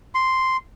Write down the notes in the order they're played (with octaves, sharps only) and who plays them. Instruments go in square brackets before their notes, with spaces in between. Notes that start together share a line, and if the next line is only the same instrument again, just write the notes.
[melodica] C6